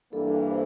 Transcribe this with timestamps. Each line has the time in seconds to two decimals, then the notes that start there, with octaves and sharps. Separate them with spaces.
0.13 G2 E3 G3 A#3 D4 A4
0.50 C5